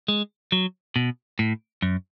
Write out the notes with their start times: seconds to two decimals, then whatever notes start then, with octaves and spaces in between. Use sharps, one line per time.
0.08 G#3
0.52 F#3
0.96 B2
1.39 A2
1.82 F#2